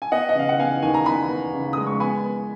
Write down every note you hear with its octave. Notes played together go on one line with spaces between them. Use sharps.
G#5
B3 D#5 F#5
D#5
C#3 F5
F#5
B3 F5 G#5
D#2 G#5
A#5
B3 G#5 B5
B3
C#3
G#3 D#6
C#6
B3 G#5 B5
B3